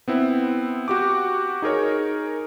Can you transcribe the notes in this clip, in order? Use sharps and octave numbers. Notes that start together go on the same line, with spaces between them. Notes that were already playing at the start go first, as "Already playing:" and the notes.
B3 C4 E4
F#4 G4 D6
D#4 G#4 A#4 C#5